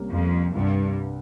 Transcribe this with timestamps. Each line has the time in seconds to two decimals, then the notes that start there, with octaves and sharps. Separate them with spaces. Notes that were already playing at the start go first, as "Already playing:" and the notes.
Already playing: C2 C3 G3 A#3 C#4
0.11 F2
0.55 C2 G2 C3 G3